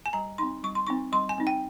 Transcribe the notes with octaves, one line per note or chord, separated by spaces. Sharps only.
G#5
G3 A#5
C4 D#4 C6
G3 C#6
C6
C4 D#4 C#6
G3 C6
G#5
C4 D#4
G5